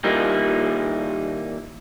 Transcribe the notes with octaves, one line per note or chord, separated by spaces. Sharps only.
D#2 A#2 G3 A#3 D#4 E4